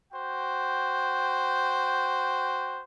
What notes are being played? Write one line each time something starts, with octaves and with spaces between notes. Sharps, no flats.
F#4 C5 G5